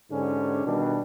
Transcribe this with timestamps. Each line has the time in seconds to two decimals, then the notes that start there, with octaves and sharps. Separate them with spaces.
0.11 G#2 D3 C#4 D4 G4 G#4
0.66 B2 D#3 G3 D4